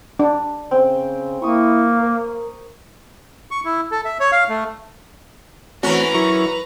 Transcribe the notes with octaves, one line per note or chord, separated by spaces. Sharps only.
D4
C#3 C4
A#3 E4 C#6 D#6
A#4
C#6
E4
A4
E5
C#5
F5
A3
E3 A3 C4 C#4 F#4 B4 A#5
F#3 E4 A#4 C#6